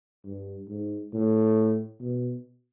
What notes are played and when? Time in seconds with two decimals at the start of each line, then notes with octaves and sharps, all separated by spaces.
0.25 G2
0.68 G#2
1.13 A2
2.00 B2